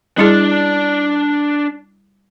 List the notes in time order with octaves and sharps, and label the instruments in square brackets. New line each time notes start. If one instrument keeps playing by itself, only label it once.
[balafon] G3 E4 G#4 [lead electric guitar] D4 D5